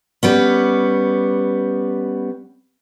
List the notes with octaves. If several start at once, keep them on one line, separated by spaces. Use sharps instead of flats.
G3 B3 C#4